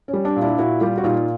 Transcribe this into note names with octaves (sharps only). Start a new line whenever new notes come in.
C#4
G3
D4
A#2
D4 E4
A#2 E4 F#4
G3 F4 G4
F#4
A#2 D#4 F4